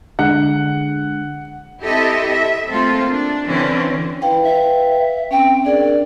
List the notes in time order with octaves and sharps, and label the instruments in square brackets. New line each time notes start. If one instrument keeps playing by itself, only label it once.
[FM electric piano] D3 G#3 [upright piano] F#5
[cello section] C4 E4 G4 A4 D#5 E5
E5
A3 A#3 C4 F4 A4
D4
D3 E3 C4 C#4
[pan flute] E4 [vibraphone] B4 F5 G5
[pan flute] E5
[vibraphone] C4 C#4 [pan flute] G5
[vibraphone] D4 G#4 A#4 [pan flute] D5